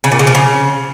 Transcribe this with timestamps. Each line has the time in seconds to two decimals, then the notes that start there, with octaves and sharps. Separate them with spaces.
0.04 C#3
0.12 A#2
0.19 C#3
0.27 F3
0.35 C#3